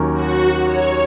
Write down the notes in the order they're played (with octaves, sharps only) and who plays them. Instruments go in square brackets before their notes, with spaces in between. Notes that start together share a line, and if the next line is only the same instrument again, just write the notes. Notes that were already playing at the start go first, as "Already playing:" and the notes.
Already playing: [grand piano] D#2 D#3 F#3 C#4
[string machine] F#4
C#5